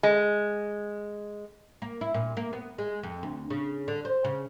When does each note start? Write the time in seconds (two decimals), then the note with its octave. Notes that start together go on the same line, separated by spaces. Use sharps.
0.03 G#3
1.82 A#3
2.01 E4
2.14 A#2
2.37 A#3
2.53 B3
2.78 G#3
3.03 F2
3.23 D2
3.50 C#3
3.88 D3
4.05 C5
4.25 C#3